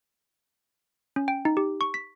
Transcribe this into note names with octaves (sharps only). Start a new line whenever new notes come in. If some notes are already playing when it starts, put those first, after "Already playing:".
C#4
G5
D#4
G4
C#6
B6